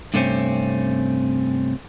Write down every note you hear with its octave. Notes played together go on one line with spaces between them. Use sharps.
G2 C3 A3 C4 C#4